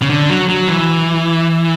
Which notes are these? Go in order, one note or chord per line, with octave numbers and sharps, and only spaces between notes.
C#3
D3
F#3
F#3
E3